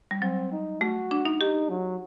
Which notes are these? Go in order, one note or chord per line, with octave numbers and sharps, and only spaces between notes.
G3
F#3 C4
D#4
A3 F#4
D4
D#4
D#4 G4
F#3